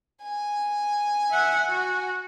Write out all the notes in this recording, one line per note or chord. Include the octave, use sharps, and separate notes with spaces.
G#5
E5 F#5
F#4